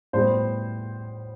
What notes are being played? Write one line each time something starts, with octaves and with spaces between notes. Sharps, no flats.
A2 G3 B3 C5